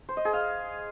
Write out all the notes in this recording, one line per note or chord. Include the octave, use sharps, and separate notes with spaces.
C5
D#5
G#4
F5